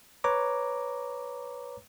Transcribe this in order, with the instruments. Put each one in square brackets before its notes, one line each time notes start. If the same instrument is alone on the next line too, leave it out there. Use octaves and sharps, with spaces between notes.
[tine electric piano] B4 C#5 A#5 D6